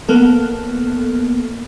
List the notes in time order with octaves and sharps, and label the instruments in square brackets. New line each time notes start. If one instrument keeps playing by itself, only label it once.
[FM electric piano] A#3 B3 A4